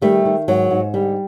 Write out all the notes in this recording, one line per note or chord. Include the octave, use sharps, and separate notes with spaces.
D#3 G3 A3
D#3
G#2 F#3
G#2
D3 G3